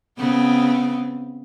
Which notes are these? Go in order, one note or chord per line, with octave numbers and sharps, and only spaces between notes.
C#3 B3 C4